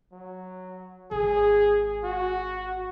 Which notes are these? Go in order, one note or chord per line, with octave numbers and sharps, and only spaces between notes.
F#3
G#1 G#4
F#4